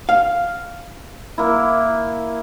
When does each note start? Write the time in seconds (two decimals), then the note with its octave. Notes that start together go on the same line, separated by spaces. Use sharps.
0.09 F5
1.38 A#3 E4